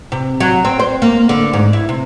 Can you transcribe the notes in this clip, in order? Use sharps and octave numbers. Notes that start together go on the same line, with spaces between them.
C3
F#3
C4
C5
A#3
D3
G#2
E4
C3